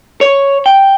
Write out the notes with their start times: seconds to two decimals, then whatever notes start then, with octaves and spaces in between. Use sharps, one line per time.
0.21 C#5
0.66 G5